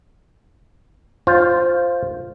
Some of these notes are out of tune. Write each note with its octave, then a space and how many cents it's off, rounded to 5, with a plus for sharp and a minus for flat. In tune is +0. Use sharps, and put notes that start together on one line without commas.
F4 +0 C5 +0